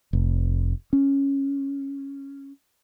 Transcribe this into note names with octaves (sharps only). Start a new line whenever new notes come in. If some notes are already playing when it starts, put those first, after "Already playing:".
F1
C#4